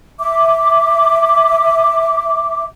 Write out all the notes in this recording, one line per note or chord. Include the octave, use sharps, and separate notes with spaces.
E5 D6